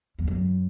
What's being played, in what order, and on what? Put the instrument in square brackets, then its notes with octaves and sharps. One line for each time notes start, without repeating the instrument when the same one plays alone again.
[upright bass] E2
F#2